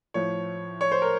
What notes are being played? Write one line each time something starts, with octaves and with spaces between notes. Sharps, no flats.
A2 F3 C#5
C#5
C5
A#4